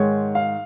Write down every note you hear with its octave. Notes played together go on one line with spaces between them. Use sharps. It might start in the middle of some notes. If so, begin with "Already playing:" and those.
Already playing: G#2 D#3 G#3 C#5
F5